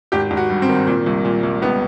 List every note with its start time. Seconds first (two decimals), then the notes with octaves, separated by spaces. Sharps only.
0.12 G#1 G4
0.31 G#1
0.37 F#4
0.50 G2
0.62 C4
0.69 D#3
0.87 A#2
1.06 C2
1.25 A#2
1.43 C2
1.62 C#2 B3